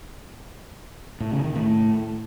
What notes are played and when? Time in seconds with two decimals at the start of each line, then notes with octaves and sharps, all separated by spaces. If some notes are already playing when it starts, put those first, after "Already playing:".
1.20 A2
1.32 C#3
1.44 D#3
1.55 A2